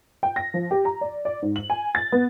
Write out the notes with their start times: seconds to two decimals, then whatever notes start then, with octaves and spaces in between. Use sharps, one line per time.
0.23 G5
0.36 A#6
0.54 F3
0.71 G4
0.85 A#5
1.01 D5
1.25 D5
1.42 G#2
1.56 F#7
1.70 G#5
1.95 A6
2.12 B3